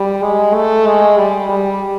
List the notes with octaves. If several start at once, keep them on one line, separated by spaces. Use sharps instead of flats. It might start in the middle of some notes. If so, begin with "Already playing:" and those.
Already playing: G3
G#3
A3
G#3
G3
G3